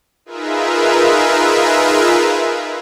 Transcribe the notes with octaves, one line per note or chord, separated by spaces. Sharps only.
D#4 F4 G#4 A#4 B4 E5